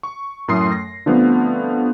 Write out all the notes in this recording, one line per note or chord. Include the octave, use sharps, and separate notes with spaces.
C#6
F#2 A2 A3 C6 D#6 C7
A#6
D3 F3 G3 A3 B3 C4